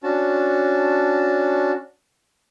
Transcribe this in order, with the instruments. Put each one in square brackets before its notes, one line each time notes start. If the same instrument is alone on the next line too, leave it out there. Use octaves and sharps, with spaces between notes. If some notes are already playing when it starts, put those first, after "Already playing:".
[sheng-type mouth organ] C#4 D4 F#4 A5